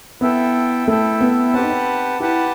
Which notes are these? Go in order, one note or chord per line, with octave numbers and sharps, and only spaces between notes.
B3 E4 A4 E5 G5
A3 E4 A4 E5 G5
B3
C4 G4 B4 F#5 A5
D#4
C4
E4 G4 B4 F#5 A5